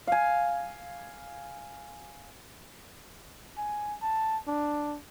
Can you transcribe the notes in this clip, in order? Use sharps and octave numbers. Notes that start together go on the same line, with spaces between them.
F5 G#5
G#5
A5
D4